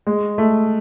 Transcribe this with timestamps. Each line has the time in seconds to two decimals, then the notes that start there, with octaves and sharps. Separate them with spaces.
0.07 G#3
0.38 A3